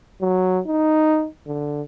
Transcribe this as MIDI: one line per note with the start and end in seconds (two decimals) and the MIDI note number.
0.21 0.60 54
0.67 1.27 63
1.47 1.82 50